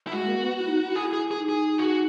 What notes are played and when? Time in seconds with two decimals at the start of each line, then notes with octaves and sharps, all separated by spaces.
0.07 E4
0.12 G#3 F#4
0.26 A#3
0.40 B3
0.59 E4
0.68 D#4
0.82 E4
0.95 G#4
1.13 G#4
1.31 G#4
1.37 D#4
1.49 G#4
1.78 F#4